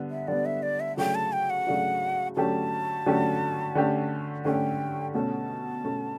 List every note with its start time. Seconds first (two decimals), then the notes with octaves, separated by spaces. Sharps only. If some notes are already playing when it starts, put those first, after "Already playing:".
Already playing: D3 G3 B3
0.10 E5
0.28 D3 G3 B3 D5
0.46 E5
0.63 D5
0.80 E5
0.97 C#3 F#3 A3 D4 F#4 G5
1.15 A5
1.32 G5
1.50 F#5
1.67 C#3 F#3 A3 D4 F#4
2.36 D3 F#3 A3 C#4 G4 A5
3.06 D3 F#3 A3 C#4 G4
3.75 D3 A3 C#4 G4
4.45 D3 A3 C#4 G4 G5
5.14 B2 A3 C#4 A5
5.84 B2 A3 C#4